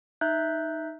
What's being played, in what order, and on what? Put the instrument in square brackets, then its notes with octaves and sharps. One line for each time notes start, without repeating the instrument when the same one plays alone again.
[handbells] D#4 E5 F#6 G6